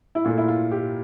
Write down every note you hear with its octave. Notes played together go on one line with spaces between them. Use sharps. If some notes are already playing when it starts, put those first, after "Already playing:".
E4
A#2 A3 F4
E4
F4
G4